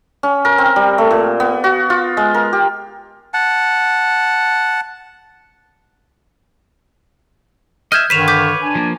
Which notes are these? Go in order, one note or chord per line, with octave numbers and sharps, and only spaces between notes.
C#4
A#4
C4
G3
A3
A#2
B3
F#4
F4
G#3
A#4
G4
F#5 A5
D#5 E5 F6 G6 G#6
G2 D3 D#3 B4 C#5 B6 E7 F7
D6 G6 B6
D4 G#5
F3 A#3